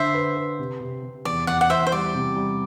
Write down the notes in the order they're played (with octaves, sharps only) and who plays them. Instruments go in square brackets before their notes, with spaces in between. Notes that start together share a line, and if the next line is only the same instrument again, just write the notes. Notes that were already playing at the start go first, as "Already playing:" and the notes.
Already playing: [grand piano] D3 [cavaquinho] C5 E5
[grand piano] B4
B4
C3
C3
C3
[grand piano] E2 [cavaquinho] D5
[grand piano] E2 [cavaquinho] D5 F#5
[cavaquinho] F#5
[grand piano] E2 [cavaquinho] C5 E5
[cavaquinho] C5
[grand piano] G3 [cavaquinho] D5
[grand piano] C3
G3